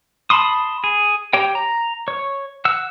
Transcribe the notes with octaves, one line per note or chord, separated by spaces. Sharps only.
A5 B5 C6 D#6
G#4
G4 C#5 G5
A#5
C#5
F#5 E6